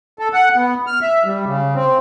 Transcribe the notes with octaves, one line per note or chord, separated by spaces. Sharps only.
A4
F#5
B3
F6
E5
G3
C#3
C4